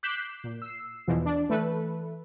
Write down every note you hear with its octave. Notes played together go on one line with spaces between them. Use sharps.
D6 F#6 G6 B6 C7 E7
A#2
E6 C7
E2 B2 E3 F3
D4
E3 A3 A4 B4